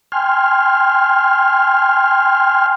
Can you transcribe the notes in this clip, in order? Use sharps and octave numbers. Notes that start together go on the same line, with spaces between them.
G5 G#5 C6 F6